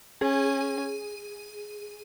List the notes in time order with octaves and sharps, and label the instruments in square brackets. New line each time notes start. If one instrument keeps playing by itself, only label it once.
[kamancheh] C#4 [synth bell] G#4